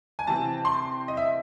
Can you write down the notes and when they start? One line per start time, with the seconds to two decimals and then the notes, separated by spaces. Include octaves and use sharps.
0.19 G#5
0.27 C3 E3 C4 A5
0.65 C6
1.08 D#5
1.17 E5